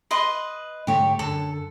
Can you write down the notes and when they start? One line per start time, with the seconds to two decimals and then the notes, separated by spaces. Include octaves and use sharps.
0.11 B4 D#5 C6
0.87 G#2 D3 A3 G4 C#5
1.19 F#2 D3 A4